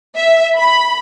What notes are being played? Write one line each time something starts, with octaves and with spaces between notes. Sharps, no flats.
E5
B5